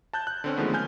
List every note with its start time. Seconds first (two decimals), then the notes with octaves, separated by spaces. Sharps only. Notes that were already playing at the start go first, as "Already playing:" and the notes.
0.13 A5 F#6 G6
0.27 F#6
0.44 D3 C4 C#4
0.57 D3 D#3 F3 G#3 A3 B3
0.74 G#5 F6 G6